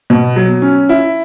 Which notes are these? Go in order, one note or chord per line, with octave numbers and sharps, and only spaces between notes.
B2
F#3
C#4
E4